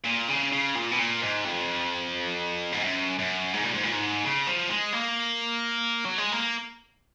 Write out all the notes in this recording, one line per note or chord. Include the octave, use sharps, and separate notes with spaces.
A#2
C#3
C#3
A#2
B2
A#2
G#2
F2
G#2
F#2
F#2
G#2
A#2
G#2
A#2
G#2
C#3
F3
G#3
A#3
F#3
G#3
A#3